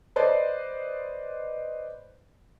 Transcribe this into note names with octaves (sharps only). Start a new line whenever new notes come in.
B4 C5 D5 D#5